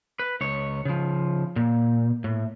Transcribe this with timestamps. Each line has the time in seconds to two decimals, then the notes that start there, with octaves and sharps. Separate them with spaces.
0.19 B4
0.41 C#2 C#5
0.85 C#3 F3
1.56 A#2
2.24 A2